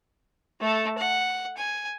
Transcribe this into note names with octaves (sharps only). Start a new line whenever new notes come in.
A3 A4
F#5
G#5